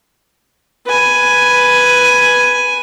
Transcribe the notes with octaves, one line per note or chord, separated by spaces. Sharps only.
B4 G#5